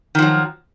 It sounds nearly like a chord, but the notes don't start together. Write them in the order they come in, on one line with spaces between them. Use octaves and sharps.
D#3 F3 F#3